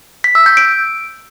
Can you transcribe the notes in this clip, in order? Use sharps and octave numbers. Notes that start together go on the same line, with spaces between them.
B6
E6
G6
D7